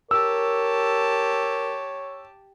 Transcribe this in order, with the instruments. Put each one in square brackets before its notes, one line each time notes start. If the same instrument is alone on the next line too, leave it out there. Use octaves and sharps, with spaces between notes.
[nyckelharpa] G4 A5 [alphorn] A#4 [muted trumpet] C#5 [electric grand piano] E6